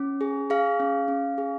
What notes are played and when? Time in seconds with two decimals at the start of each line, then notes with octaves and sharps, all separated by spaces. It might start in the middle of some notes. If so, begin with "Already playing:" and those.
Already playing: C#4
0.21 G#4
0.50 G#4 F5
0.80 C#4
1.08 C#4
1.38 G#4